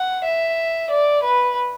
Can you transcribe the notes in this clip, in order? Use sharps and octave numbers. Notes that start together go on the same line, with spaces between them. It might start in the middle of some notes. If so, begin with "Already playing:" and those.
Already playing: F#5
E5
D5
B4